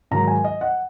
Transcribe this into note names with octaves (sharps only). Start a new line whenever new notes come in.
G#2 D#3 F#3 A#5
G#5
D#5
F#5